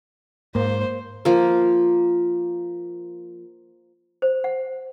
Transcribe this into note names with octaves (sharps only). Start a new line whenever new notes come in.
G#2 A#3 C5
F3 A#3
C5
F#5